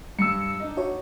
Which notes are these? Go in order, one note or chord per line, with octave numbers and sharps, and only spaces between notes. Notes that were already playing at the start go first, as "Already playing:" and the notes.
G2 E6 C#7
D4 D#4
F#4 C#5